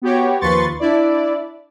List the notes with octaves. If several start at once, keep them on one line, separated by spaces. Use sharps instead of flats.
B3 F#4 G4 C#5
D#2 F3 B4 C6 C#6 A6
D4 E4 D5